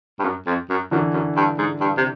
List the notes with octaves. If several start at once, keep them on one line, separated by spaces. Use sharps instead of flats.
G2
F#2
F2
F#2
F#2 D3 E3
F#2
G2
G#2
G2
C3